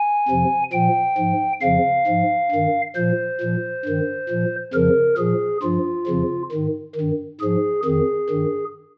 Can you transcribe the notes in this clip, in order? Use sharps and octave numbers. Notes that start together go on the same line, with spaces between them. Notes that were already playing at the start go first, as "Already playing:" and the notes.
Already playing: G#5
F2 C3 F3
A#2 F3 G5
G#2 F3
F2 C#3 F3 F5
G#2 F3
G2 D#3
A#2 F3 C5
A#2 F3
G2 D#3
A#2 F3
F2 C#3 F3 A#4
A#2 F3 G#4
G2 F3 F4
F2 C#3 F3
G#2 D#3
G2 D#3
G#2 F3 G#4
F2 D#3 G#4
G2 D#3